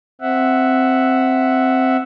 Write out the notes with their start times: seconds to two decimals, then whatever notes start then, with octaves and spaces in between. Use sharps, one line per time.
0.21 C4 E5 F#5